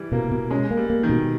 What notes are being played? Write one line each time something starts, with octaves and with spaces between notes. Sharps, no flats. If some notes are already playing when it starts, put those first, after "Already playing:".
Already playing: E3 G3
B2 A#3
B2
G#3 C#4
A#3
G3
A#3
D#3
B2